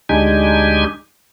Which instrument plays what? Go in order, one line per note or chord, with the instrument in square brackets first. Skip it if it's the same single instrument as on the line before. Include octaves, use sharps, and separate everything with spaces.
[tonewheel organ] D2 G#3 D4 D#4 G4 G#5